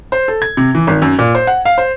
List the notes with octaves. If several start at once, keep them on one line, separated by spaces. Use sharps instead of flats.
C5
A4
G#6
C3
E3
G#1
F#2
A#2
C5
F#5
F5
C5